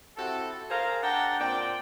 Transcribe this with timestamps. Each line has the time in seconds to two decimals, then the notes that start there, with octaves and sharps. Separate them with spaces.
0.17 C4 E4 F#4 G4 A4
0.70 G#4 A#4 C5 F5 A#5
1.03 D4 G#4 F#5 G5 A5 A#5
1.39 A#2 C4 C5 D5 G5